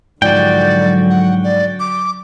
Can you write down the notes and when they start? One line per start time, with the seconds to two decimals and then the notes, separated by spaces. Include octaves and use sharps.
0.22 G#2 D3 F3 F#3 F#4 D5 G5
1.10 F#5
1.44 D5
1.80 D6